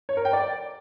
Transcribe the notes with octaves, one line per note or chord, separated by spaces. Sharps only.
C#5
A#4
G5
D5